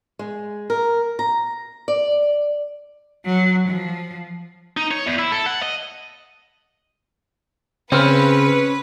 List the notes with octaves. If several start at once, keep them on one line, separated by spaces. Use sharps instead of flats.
G#3
A#4
A#5
D5
F#3
F3
D#4
C#5
E2
E4
A4
F#5
D#5
C#3 C4 C#4 B4 F6